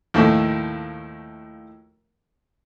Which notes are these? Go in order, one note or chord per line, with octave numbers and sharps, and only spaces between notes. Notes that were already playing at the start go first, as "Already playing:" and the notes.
D#2 A2 F3 A3